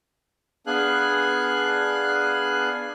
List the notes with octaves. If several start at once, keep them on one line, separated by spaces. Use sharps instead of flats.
B3 D4 G#4 F5 G#5 F#6